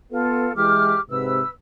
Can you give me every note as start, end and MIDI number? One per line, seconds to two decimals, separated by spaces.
0.11 0.48 59
0.11 0.52 65
0.11 0.52 69
0.56 0.95 52
0.56 0.95 56
0.56 0.99 67
0.56 0.99 86
0.56 0.99 89
1.10 1.40 44
1.10 1.40 48
1.10 1.49 71
1.10 1.49 88